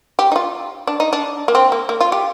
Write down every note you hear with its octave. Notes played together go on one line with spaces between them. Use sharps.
G4
D#4
F4
D4
D#4
D4
A#3
C4
A#3
A#3
F4
G4